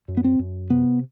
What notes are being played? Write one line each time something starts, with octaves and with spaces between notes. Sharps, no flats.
F#2
B3
C4
F#2
C3 B3